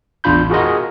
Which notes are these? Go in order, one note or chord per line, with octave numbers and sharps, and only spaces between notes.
A1 E2 D4 F4 B5 G6
F4 F#4 G#4 A#4 D#5